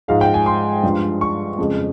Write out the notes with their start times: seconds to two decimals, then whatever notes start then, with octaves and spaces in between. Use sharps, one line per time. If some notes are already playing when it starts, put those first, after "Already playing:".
0.08 G#2 F3 G#3 F5
0.21 G5
0.34 G#5
0.46 C6
0.83 G2 F3 G#3
1.21 C#6
1.58 F2 C#3 G#3